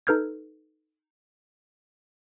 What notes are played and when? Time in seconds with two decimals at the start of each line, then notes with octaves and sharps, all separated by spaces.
0.07 D#4 A4 B4 F6 G6 G#6